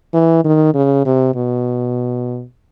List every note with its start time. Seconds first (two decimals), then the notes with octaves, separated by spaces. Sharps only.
0.14 E3
0.44 D#3
0.74 C#3
1.06 C3
1.35 B2